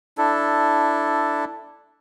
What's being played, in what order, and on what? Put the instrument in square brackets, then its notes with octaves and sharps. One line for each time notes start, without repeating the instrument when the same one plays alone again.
[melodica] D4 E4 A4